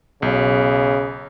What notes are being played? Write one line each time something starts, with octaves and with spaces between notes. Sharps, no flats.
B1 C#3